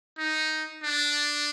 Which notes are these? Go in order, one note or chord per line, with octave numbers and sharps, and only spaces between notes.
D#4
D4